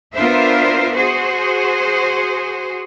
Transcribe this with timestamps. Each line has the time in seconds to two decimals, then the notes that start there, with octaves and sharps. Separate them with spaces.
0.14 B3 D4 F4 A#4 C5 E5
0.93 F#4 G#4 C5